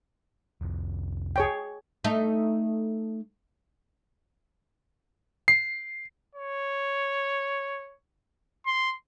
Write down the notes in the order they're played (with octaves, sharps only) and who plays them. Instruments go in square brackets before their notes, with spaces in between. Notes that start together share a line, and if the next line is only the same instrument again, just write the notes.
[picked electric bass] F1 C2 F2
[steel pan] G#4 C#5 G5
[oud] A3 D#4
[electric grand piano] C7
[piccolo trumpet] C#5
C6